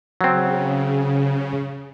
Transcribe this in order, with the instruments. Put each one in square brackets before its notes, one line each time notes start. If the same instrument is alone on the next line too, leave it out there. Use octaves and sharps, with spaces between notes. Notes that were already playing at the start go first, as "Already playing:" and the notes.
[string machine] C#3 [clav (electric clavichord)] F#3 C4